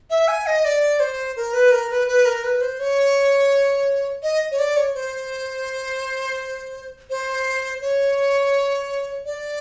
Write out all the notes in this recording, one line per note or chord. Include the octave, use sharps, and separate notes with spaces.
E5
G#5
D#5
D5
C5
A#4
B4
A#4
B4
B4
A#4
B4
C5
C#5
D#5
C#5
D5
C#5
C5
C5
C#5
D5